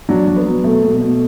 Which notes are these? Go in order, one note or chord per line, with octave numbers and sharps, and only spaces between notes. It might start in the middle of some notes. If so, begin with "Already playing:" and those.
F#3 D4
F#3
B3
F#3
B2 A3
B2
A3
B2